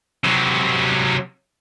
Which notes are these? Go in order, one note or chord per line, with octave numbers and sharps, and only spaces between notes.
C3 F#3